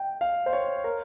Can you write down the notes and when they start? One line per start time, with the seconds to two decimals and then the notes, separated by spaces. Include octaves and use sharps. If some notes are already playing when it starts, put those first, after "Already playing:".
Already playing: G5
0.21 F5
0.46 C5
0.53 C#5
0.84 A#4